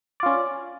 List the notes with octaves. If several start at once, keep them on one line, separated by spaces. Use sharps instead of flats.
C#4 F4 D5